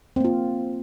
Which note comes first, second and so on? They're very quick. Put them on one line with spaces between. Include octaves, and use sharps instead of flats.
C4 A#3 F4